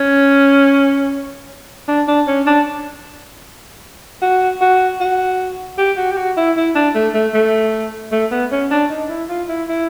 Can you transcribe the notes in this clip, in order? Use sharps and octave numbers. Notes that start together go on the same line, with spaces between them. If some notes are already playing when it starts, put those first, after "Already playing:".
Already playing: C#4
D4
D4
C#4
D4
F#4
F#4
F#4
G4
F#4
G4
F#4
E4
E4
D4
A3
A3
A3
A3
B3
C#4
D4
D#4
E4
F4
E4
E4